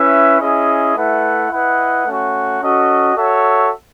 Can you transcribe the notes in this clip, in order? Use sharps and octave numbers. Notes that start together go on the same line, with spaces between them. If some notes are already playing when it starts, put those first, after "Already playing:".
Already playing: C#4 E4 B4 E5
C#4 E4 G#4 D#5
A3 E4 B4 F#5
E4 B4 D#5 F#5
A3 C#4 F#4
C#4 F#4 A4 D#5
F#4 A4 C#5 E5